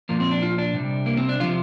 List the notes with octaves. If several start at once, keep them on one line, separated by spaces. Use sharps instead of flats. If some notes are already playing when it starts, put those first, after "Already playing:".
A#2 F3 A#3
C4
D4
F4
D4
C3 G3
A#3
C4
D4
C3 F3 F4